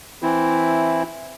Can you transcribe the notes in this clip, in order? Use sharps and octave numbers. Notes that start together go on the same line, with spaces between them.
E3 C4 E4